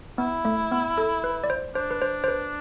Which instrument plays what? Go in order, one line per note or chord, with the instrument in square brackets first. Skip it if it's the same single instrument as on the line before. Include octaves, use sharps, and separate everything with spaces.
[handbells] B3 [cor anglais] E4
[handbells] A3
B3
A4
B4
D5
C5
[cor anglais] D4 [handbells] C5
[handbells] B4
C5
C5
B4